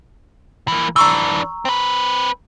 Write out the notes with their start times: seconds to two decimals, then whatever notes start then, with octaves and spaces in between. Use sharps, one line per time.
0.68 E3 A#3
0.96 E3 D4 A#5 C#6 E6
1.65 C4 B4